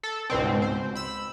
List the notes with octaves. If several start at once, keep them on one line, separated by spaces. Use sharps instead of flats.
A4
C#2 G#2 B2 C4
C5
B5 E6